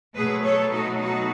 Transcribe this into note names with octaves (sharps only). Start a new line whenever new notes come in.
B2 F#3 A3 G#4 B4
A4 C#5
D#4 F#4
D#4 F#4